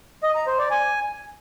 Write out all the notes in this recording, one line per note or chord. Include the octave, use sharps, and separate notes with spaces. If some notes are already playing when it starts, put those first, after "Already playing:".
D#5
A#5
C5
D5
G#5